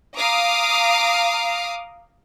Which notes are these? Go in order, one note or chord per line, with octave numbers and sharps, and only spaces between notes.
F5 A#5 D6 D#6